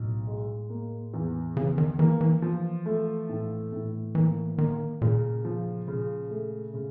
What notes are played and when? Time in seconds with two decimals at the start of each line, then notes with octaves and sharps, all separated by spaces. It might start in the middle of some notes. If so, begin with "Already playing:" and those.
Already playing: B1 A2
0.27 G#3
0.70 A#3
1.14 E2
1.57 E2 C#3
1.78 D#3
1.99 E3 A#3
2.21 E3
2.42 F3
2.86 A3
3.29 A2
3.72 A2
4.15 E3 A#3
4.58 D#3 A#3
5.02 A#2 C#3
5.45 F3
5.88 C#3
6.30 A3
6.74 C#3